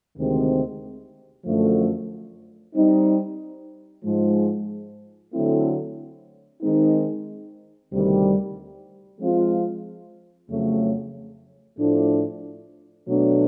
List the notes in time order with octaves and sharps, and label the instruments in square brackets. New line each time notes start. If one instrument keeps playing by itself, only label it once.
[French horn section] D2 C3 D#3 G#3 C4
F#2 D3 F3 A3
G3 C4 D#4
G#2 F3 G#3
D3 F#3 A3 C4 E4
D#3 G#3 C4 D#4
D2 C3 D#3 G3
F3 G#3 C4 F4
F2 C#3 F#3 A3
A2 F3 A3 D4
B2 F#3 A3 D4